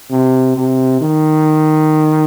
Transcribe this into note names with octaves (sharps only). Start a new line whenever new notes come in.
C3
C3
D#3